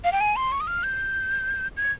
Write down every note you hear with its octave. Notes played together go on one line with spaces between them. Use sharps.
F5
G5
G#5
C6
C#6
D#6
F6
G6
G#6